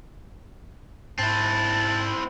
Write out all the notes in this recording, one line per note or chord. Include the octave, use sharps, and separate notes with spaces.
G#2 C4 E4 A5